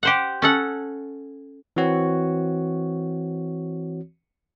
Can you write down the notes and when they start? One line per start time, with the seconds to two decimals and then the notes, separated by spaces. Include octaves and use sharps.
0.03 G4 C5 F#5
0.42 C#4 A4 F#5
1.76 E3 C4 F#4 C#5